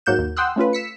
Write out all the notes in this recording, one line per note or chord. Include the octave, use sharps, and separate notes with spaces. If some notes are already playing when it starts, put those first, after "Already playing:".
G#2 F#3 A#3 F#5 G6 E7
D#2
F#5 G5 C6 D#6 E6 F#6
A3 C#4 F4 B4
E6 B6 C#7